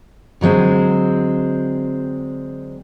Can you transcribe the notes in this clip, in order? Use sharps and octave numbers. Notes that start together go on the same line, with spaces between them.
D3 F#3 G#3 C4